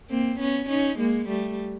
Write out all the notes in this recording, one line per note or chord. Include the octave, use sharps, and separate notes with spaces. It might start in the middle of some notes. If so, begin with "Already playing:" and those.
A#3 C4
B3 C#4
C#4 D#4
G#3 A#3
G3 A3